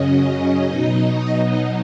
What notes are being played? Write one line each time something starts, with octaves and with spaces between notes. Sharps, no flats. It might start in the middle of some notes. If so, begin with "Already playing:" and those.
Already playing: F#2 C#3 F#3 C#4 D#5
B2 F#3 D#4